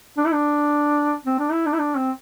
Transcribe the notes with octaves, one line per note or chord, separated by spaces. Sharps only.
D4
E4
D4
C4
D4
E4
D4
E4
D4
C4